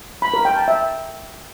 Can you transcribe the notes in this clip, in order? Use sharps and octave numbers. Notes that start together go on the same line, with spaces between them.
B5
A#4
G5
A5
E5